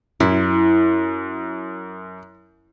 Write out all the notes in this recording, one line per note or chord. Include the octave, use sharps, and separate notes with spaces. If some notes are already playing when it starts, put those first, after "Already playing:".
F#2 E4